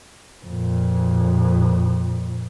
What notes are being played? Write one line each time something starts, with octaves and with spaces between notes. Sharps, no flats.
F2 A#2